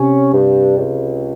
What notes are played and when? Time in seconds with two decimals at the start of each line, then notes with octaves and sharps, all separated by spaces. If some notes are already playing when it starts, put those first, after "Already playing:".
Already playing: C3 C#4
0.33 G2
0.77 C#2